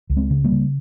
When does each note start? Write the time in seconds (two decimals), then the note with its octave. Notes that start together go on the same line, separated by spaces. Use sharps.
0.10 C#2
0.17 G#3 C4
0.30 C#3
0.44 G3 A#3
0.52 C#3